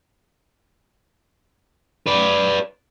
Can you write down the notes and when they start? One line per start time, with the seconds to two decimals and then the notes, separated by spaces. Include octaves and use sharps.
2.07 B4 D5